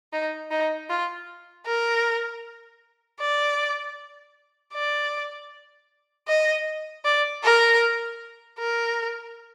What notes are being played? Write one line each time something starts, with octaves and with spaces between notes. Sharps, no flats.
D#4
D#4
F4
A#4
D5
D5
D#5
D5
A#4
A#4